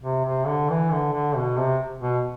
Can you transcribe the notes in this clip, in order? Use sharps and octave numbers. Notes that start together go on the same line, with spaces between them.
C3
C3
D3
E3
D3
D3
B2
C3
B2